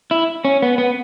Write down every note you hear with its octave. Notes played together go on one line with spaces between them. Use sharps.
E4
C#4
B3
B3